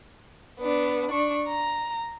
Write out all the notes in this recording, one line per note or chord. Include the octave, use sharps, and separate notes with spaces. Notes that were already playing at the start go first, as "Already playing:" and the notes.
B3 D4
D4 C#6
A#5